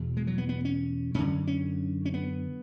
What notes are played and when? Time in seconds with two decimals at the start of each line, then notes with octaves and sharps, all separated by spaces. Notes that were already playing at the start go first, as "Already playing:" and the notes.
Already playing: E2 B2
0.17 G#3
0.27 F#3
0.38 B3
0.49 B3
0.65 C#4
1.14 F#2 D3 C#4
1.47 C#4
2.06 C#4
2.14 B3